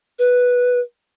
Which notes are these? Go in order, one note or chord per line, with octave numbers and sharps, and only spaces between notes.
B4